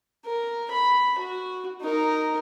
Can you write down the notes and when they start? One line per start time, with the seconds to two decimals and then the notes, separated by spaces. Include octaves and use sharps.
0.25 A#4
0.71 B5
1.18 F#4
1.81 D#4 A#4